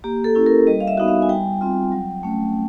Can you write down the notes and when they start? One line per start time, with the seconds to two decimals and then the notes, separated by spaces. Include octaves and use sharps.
0.04 A#3 G4
0.24 A4
0.35 C#4 E4
0.46 A#4
0.67 G3 D#5
0.80 F5
0.88 E5
0.97 B3 D#4 F#4
1.08 F5
1.22 G#5
1.29 G3 G5
1.61 C4 F4
1.92 F#3
2.23 A3 C#4